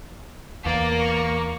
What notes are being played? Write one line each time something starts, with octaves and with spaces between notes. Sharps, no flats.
E2 A#3 D5
C#6